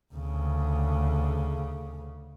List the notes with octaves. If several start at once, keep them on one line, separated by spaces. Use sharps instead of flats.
D2 C#3